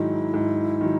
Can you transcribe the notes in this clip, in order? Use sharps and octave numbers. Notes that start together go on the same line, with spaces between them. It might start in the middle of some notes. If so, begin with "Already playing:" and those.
Already playing: G#2 D#3 F#3 E4
G#2
D#3 F#3